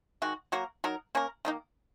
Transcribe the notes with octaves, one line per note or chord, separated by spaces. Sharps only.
D#3 G#3 F#4
F#3 A#3 F#4 A#4
F#3 D#4 A#4
A#3 C#4 A#4
D#3 A#3 D#4